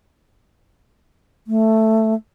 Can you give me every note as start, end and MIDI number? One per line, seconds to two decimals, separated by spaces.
1.47 2.14 57